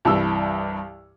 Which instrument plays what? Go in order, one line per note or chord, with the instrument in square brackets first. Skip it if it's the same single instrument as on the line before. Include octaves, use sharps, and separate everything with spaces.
[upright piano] C2 G2 E3 E6